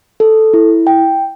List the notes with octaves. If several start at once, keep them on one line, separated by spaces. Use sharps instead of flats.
A4
E4
G5